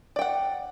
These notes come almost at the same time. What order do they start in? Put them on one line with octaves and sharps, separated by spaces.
D5 G5 F#5